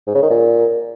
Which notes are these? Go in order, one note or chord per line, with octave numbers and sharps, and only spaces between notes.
G#2
C#3
D#3
A#2